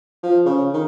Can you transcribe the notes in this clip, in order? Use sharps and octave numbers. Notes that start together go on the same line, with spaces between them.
F3
C#3
D#3